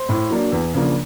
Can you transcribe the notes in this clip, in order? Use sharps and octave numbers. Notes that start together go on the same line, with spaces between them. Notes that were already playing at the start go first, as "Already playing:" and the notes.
Already playing: C5
A2
F#3 A#3 D4
E2
C#3 F3 A#3 D4